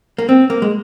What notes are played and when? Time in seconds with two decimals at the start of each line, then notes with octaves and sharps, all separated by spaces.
0.18 A#3
0.29 C4
0.50 A#3
0.62 G#3